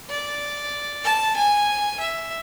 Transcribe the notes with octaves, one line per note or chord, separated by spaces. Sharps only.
D5
A5
G#5
E5